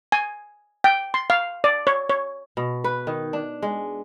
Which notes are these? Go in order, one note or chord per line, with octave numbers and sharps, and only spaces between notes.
G#5
G5
C6
F5
D5
C#5
C#5
B2
B4
D#3
D4
G#3